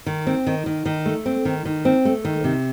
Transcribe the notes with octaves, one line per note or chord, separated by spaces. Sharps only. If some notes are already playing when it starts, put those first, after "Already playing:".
D#3
C4
D#3
D#3
D#3
A3
C4
D#3
D#3
C4
A3
D#3
C3